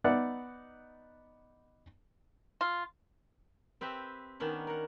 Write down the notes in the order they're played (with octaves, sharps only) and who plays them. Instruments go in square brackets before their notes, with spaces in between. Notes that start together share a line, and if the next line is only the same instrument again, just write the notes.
[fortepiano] B3 D#4 D5 E5 F#5
[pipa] F4
[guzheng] C4 G4 B4 E5
D#3 B3 C#4 D4
A#4 F#5